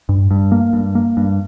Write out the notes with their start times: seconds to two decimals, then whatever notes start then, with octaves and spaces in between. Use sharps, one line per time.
0.09 G2
0.31 G2
0.52 A#3
0.73 G2
0.95 A#3
1.17 G2